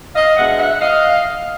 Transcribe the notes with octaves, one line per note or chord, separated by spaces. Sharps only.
D#5 F5
B2 G#3 B3 D4 E5 F#5
E5 F#5
D#5 F5